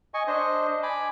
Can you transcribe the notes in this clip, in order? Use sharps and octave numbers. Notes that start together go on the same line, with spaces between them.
D#5 G#5 C#6
D4 C5 D#5
G#5 B5 D6